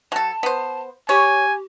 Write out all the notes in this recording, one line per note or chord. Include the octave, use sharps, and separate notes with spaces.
F#3 A4 A5
B3 C5
G4 C#5 G#5